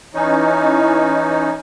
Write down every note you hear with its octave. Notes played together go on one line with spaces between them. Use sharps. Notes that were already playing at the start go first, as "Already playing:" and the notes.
E3 C#4 D#4